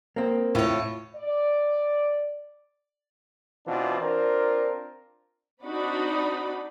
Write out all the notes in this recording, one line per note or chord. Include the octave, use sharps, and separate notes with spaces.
A#3 C4
A2 F4 C#5
D5
B2 E3 C4 D4 F4
C4 D4 F4 A#4
C4 D4 D#4 F#4 D5 B5